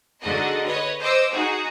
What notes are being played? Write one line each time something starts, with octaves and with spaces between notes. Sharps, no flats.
D3 G#3 D#4 F#4 D#5
B4 C#5 D#5
C5 D#5 D6 E6
D#4 F#4 G#4